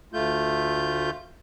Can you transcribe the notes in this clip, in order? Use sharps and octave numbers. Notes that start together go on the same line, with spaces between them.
D2 A3 F4 G6